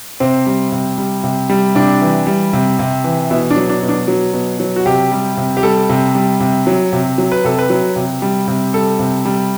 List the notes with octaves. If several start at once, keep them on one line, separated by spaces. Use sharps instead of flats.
C3 C4
G3
C3
G3
C3
G3
C3 D4
E3
G3
C3
C3
E3
B2 E4
D4
F#3
D4
B2
D4
F#3
B2
F#3
F#4
C3 G4
G3
C3
G4
G3 A4
C3
G3
C3
F#3
C3
F#3
B4
C3 A4
B4
F#3
C3
G3
C3
G3 A4
C3
G3